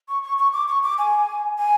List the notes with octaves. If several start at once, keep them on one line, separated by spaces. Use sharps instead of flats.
C#6
C#6
C#6
D6
C#6
D6
G#5
G#5